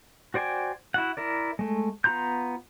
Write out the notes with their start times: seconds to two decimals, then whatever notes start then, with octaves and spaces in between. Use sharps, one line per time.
0.34 F#4 C5 D5 G5 G#5
0.94 E4 F#4 F#5
1.17 E4 A#4 D5
1.59 G#3 A3
2.04 B3 F4 A#5 C6 G6